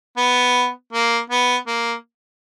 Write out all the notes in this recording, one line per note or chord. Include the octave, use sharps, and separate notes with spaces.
B3
A#3
B3
A#3